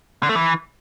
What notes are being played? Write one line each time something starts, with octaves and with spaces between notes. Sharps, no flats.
D3
A3
E3